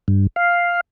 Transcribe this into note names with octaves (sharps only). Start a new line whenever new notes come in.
G2
F5